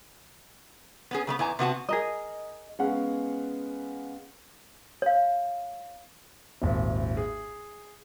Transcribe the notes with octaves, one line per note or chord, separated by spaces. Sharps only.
B3 C#4 G#4
C#3 A3 B3
E2 E3 G#5 A#5
C3 B3 F#4 A5
G#4 A#4 D#5
G#3 B3 C#4 F5 F#5
C#5 F5
D#1 G#1
G#4